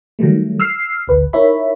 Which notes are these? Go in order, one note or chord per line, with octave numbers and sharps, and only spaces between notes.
D#3 F#3 G3 A3
E6 F6 C7
G#1 D2 B4
D#4 E4 A#4 C#5 E5 B5